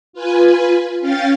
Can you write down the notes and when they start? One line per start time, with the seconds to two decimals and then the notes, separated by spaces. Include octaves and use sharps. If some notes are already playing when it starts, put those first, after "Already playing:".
0.13 F4 B4 G#5
1.01 C#4 F5 G5 A6